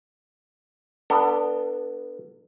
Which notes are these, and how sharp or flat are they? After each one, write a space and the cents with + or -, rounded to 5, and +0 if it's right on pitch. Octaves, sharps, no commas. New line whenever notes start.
B3 +0 D4 +0 A4 +35